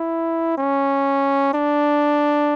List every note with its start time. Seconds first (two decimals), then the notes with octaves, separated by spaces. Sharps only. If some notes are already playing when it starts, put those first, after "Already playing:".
Already playing: E4
0.58 C#4
1.53 D4